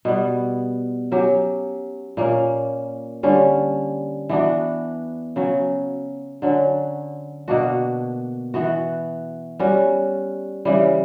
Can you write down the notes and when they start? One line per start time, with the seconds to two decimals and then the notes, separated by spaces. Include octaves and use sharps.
0.05 B2 G3 B3
1.11 F#3 C#4 G4
2.17 A#2 A#3 C#4
3.23 D3 G3 C#4
4.29 E3 B3 D4 F#4
5.36 C#3 F#3 C#4
6.42 D3 F#3 C#4
7.48 B2 A#3 D4 F#4
8.54 E3 B3 F#4
9.59 G3 C#4 F#4
10.65 C#3 E3 G3